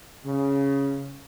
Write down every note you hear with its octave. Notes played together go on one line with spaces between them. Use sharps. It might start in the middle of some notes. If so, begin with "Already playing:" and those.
C#3